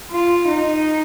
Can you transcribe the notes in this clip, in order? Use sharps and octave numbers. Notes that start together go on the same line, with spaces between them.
F4
D#4